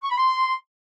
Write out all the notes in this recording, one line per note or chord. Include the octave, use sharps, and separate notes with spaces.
C#6
B5
C6